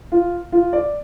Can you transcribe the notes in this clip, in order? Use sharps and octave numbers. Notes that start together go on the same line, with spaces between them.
F4
F4
D5